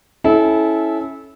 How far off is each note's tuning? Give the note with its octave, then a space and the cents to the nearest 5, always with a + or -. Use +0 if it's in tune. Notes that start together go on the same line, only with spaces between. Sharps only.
C#4 -10 E4 -15 A4 -25